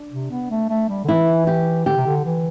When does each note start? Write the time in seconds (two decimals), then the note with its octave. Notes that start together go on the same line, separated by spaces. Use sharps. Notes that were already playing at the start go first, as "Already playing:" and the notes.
Already playing: D4
0.11 C3
0.31 B3
0.50 A3
0.70 A3
0.89 G3
1.04 D3
1.08 E3 E4
1.47 G4
1.86 D3 G4
1.97 C3
2.06 D3
2.25 E3